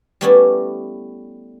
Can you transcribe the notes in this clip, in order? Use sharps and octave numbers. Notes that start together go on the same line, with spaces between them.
G3 A3 B3 C#4 E4 D5